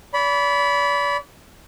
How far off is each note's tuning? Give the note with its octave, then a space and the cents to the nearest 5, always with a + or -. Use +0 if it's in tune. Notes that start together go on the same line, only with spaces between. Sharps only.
D5 -40 B5 +0